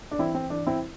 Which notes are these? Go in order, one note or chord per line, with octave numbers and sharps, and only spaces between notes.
D4
E3 C4 E4
C4
E3 D4
C4 E4